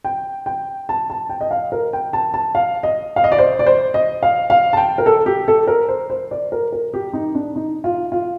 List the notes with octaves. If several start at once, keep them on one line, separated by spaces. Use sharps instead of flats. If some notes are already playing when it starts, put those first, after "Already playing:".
G5
G5
A5
A5
G5
D#5
F5
A#4
G5
A5
A5
F5
D#5
F5
D#5
D5
C5
D5
C5
D#5
F5
F5
A5
G5
A#4
A4
G4
A4
A#4
C5
C5
D5
A#4
A#4
G4
D#4
D4
D#4
F4
F4